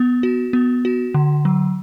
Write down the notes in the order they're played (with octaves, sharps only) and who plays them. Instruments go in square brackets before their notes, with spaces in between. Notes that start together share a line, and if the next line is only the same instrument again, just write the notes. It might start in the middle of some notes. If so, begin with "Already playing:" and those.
Already playing: [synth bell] B3
F#4
B3
F#4
D3
F#3